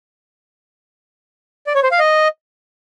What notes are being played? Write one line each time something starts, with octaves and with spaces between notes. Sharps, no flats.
D5
C#5
C5
F5
D#5